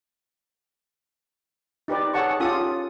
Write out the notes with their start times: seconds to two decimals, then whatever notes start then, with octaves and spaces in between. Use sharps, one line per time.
1.88 D#4 G4 B4 D5
2.13 G#4 A4 C#5 F#5 A5 C#6
2.40 C#4 F4 G4 A4 D#6